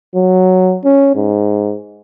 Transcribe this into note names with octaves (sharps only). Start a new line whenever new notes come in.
F#3
C#4
G#2